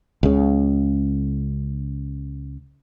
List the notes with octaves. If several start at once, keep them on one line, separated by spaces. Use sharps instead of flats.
C#2 C#3